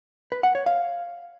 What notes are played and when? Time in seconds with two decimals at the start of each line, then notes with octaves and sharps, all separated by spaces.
0.32 B4
0.43 F#5
0.55 C#5
0.66 F5